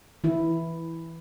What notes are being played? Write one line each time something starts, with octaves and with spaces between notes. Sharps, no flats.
E3 E4